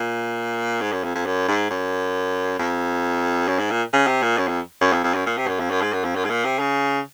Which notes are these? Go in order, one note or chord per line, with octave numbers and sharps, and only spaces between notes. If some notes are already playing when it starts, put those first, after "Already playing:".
Already playing: A#2
G#2
F#2
F2
F2
F#2
G#2
F#2
F2
F#2
G#2
A#2
C#3
C3
A#2
F#2
F2
F#2
F2
F2
F#2
A#2
C3
F#2
F2
F#2
G#2
F#2
F2
F#2
G#2
A#2
C3
C#3